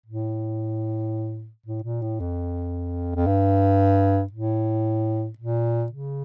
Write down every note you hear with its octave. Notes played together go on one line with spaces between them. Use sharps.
A2
A2
A#2
A2
F2
F2
G2
A2
A#2
C#3